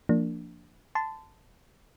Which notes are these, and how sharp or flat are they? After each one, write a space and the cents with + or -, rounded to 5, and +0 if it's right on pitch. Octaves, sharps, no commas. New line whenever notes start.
F3 -25 A#3 -25 D4 +0
A5 +0 C6 -30